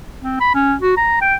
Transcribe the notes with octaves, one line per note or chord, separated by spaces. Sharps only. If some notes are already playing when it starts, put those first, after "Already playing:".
C4
B5
C#4
F#4
A#5
G5